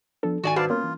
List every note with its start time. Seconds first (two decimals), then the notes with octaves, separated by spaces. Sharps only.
0.23 F3 B3 D4 A4
0.43 G#2 D#3 F#4 D5 G#5
0.56 G2 F#4 B4 C5 D5 F5 A5
0.70 A#3 B3 C#4 F4
0.83 E3